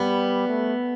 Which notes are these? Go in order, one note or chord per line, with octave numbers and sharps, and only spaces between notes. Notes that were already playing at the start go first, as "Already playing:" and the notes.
Already playing: G3 B3
A3